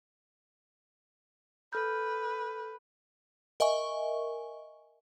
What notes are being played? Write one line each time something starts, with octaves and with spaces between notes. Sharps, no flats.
A4 B4 F6 G6
A#4 D#5 E5 G#5 C#6